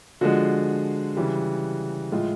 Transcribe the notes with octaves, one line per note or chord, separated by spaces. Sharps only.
D3 F3 G#3 F#4
C#3 E3 G3
A2 F3 G#3 F4